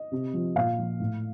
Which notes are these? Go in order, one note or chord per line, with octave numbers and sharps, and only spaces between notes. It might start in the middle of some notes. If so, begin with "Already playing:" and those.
Already playing: D#5
C3
F3
A#2 F5
F3
A2